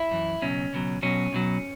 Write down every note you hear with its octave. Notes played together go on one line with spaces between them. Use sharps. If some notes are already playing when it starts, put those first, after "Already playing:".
Already playing: E4
F#2 E3
C#2 B2 F#3 C#4
C#2 B2 F#3
B1 B2 F#3 C#4
B1 B2 F#3